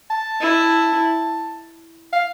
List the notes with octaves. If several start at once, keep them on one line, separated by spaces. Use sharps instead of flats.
A5
E4
F5